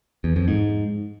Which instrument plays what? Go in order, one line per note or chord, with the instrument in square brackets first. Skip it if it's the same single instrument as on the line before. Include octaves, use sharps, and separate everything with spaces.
[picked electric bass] E2
F2
G#2